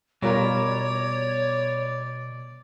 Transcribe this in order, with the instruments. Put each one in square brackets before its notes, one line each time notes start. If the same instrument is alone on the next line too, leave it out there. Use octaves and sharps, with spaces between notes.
[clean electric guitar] B2 [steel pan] G3 F4 A#4 [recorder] C#5 [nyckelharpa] D5